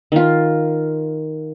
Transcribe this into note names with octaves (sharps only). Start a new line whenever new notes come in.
D#3 F4